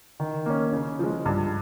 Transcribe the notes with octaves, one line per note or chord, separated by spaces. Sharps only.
D#3
A#3 C#4
C#3
F3 G#3
G2